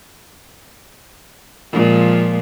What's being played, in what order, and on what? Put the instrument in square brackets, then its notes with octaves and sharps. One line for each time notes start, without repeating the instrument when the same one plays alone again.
[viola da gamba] A#2 F3 G#3